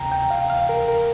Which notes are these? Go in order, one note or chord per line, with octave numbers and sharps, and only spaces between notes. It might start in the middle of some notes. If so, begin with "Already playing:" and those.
Already playing: D2 C3 G5 A#5
G5
F5
F5
A#4
A#4